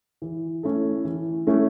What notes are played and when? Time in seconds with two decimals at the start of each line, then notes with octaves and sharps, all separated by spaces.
0.22 E3
0.63 A3 C#4 E4 A4
1.05 E3
1.47 A3 C#4 E4 A4